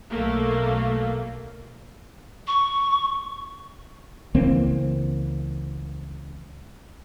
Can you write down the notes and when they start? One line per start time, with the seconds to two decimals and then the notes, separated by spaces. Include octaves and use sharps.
0.11 B1 A3 A#3
2.47 C#6
4.34 C#2 E3 A#3 C4